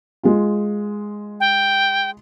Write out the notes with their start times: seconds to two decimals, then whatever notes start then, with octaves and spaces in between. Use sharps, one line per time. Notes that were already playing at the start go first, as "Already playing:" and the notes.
0.23 G#3 F4
1.40 G5